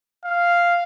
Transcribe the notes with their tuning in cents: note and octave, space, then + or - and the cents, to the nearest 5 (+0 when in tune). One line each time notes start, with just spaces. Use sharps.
F5 -5